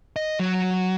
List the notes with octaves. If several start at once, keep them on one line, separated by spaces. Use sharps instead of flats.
D#5
F#3